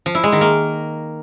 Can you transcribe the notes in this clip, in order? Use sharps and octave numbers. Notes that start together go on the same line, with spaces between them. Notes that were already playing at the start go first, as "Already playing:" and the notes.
F3
E4
G#3
D#3
A#3